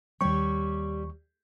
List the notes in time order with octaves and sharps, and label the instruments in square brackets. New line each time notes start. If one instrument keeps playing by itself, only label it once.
[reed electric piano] D#2 C#6 [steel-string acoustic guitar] G3 G4 C#5